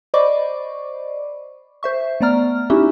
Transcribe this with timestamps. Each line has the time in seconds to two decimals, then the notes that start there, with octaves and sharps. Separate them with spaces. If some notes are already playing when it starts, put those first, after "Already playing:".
0.14 C5 D5 D#5 B5 C#6 D6
1.83 C5 E5 C#6
2.21 A3 B3 D5 A#5 F6
2.70 C#4 D#4 E4 F#4 G4 E5